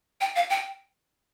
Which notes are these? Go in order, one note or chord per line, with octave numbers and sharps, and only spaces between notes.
G5
F5
G5